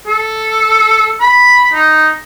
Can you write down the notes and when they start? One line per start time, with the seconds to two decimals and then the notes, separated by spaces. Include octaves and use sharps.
0.07 A4
1.20 B5
1.73 D#4